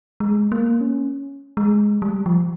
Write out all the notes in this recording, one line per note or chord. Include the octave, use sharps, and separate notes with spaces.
G#3
A#3
C#4
G#3
G3
F3